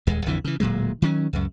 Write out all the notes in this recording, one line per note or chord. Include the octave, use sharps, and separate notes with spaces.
D#1 D#2 G#3
A#1 F2 D3 E3
C#3 E3
D1 A#2 F#3 G#3
D#3 F#3 C4 C#4
C#2 F#2